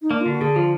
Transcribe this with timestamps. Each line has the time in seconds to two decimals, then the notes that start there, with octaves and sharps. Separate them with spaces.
0.02 D#4
0.11 A#3 D4
0.21 D3 F4
0.31 F#4
0.41 D3 G#4
0.56 F3 F4